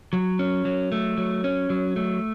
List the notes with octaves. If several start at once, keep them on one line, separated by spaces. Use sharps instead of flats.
F#3
C#4
F#3
A3
F#3
C#4
F#3
A3